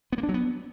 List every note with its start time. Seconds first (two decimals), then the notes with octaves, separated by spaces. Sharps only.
0.12 B3
0.18 A#3
0.23 D4
0.29 F#3
0.34 B3